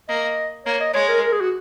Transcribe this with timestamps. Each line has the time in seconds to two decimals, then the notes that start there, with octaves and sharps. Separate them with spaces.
0.09 A#3 D#5
0.66 A#3 C#5
0.80 D#5
0.94 G#3 C#5
1.09 A#4
1.22 A#4
1.32 G#4
1.41 F#4